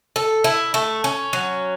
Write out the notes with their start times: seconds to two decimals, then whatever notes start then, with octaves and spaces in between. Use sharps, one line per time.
0.16 A4
0.44 E4
0.74 A3
1.04 C#4
1.33 F#3